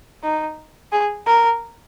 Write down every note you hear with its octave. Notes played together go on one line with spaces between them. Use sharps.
D#4
G#4
A#4